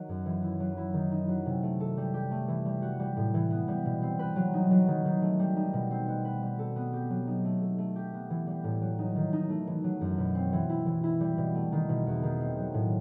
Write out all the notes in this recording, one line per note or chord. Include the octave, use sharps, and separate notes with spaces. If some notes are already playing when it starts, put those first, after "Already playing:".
Already playing: D#3 F#3
F#2
E3
E4
F#3
E4
D#3
D#4
F#3
C3
A3
A4
G3
G4
A3
E3
G3
F#4
G3
A2
E3
B3
G3
B2
C4
B4
F#3
D#4
F#3
D#3
D#3
A3
G3
D#4
B2
C4
B3
B4
G3
A4
B3
G4
F#3
D#4
A3
A4
A3
G4
B3
E3
G3
A2
F#3
D#4
D#3
D#4
A3
E3
F#3
F#2
B2
C4
E3
E4
E3
E4
G3
B2
A3
D#3
B2
E2
D#3
C4
F#3
A2